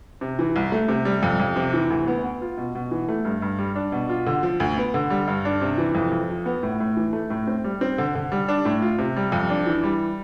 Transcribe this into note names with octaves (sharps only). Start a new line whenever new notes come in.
C3
E3
C2
A3
C3
G3
F2
F2
C3
E3
D2
B3
B3
F4
B2
B2
E3
A3
G2
G2
G3
D4
B2
F4
D3
F3
D2
B3
D3
G3
G2
D4
C3
E3
F2
F2
F3
B3
A2
A2
E3
A3
A2
C4
G3
C4
D3
D3
G3
D4
A2
F4
C3
G3
F2
D4
E3
G3